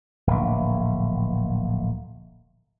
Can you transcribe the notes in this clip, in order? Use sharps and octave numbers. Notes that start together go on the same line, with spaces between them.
D1 A#1